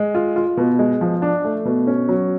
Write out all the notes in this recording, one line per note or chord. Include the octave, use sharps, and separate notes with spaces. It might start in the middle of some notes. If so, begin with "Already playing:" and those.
Already playing: G#3
F4
F4
B2
G#3
F3
D4
A3
B2
C#4
F#3